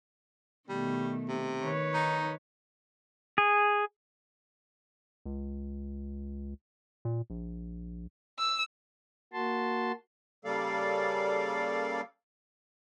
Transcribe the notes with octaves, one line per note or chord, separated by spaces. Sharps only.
B2 D#3 G3 A3
C3
D#3 B4 C#5
D#4
G#4
C#2
A#2
A#1
E6
A#3 F#4 A5 C6
C#3 G3 A#3 A4 D5 F5